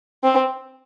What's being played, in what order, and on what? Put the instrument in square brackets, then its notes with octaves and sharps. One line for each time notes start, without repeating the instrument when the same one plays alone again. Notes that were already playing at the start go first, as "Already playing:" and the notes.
[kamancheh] C4